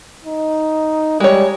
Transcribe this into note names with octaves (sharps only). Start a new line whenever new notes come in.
D#4
G3 G#3 C#5